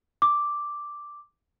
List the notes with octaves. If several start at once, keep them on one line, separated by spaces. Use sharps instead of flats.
D6